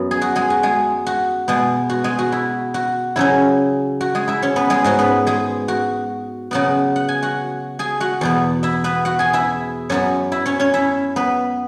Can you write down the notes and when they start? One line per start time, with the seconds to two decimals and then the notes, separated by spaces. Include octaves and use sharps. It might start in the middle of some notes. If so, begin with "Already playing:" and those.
Already playing: F#2 F#3 B3
0.11 G#4
0.22 F#4
0.36 G#3 G#4
0.50 F#4
0.63 G#3 G#4
1.07 F#4
1.48 B2 G#3 B3
1.89 F#4
2.04 G#3 G#4
2.19 F#4
2.32 E4
2.74 F#4
3.16 C#3 F#3 C#4 E4
4.01 F#4
4.15 G#3 G#4
4.28 E4 E5
4.42 C#4 C#5
4.56 B3 B4
4.70 G#3 G#4
4.84 G#2 G#3 C#4 F#4
4.99 B3 B4
5.27 G#3 G#4
5.68 F#4
6.51 C#3 F#3 B3 F#4 F#5
6.96 F#5
7.08 G#5
7.23 F#4 F#5
7.79 G#4 G#5
8.00 F#4 F#5
8.21 E2 B2 B3
8.63 E4 E5
8.84 B3 B4
9.05 F#4 F#5
9.19 G#4 G#5
9.33 E4 E5
9.89 F#2 F#3 B3 C#4 C#5
10.32 E4 E5
10.46 C#4 C#5
10.60 C#4 C#5
10.74 E4 E5
11.16 B3 B4